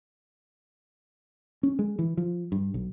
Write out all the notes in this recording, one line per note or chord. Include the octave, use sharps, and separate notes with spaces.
C#4
G#3
E3
F3
G2
B1